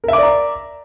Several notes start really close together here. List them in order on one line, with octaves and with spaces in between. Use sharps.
A#4 E5 D6 D5 A#5